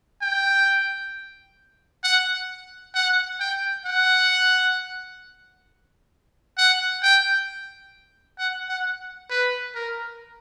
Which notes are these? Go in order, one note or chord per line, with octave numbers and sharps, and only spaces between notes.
G5
F#5
F#5
G5
F#5
F#5
G5
F#5
F#5
B4
A#4